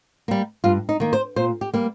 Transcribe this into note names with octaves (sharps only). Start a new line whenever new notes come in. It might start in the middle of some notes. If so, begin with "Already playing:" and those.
G3 A#3
G2 F4
D#4
D#3 A#3
C5
A#2 C5
G4
G3 A#3